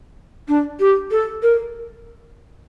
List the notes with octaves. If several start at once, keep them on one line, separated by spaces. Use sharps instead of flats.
D4
G4
A4
A#4